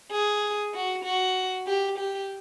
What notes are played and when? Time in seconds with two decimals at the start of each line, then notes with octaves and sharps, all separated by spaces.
0.11 G#4
0.74 F#4
1.04 F#4
1.67 G4
1.98 G4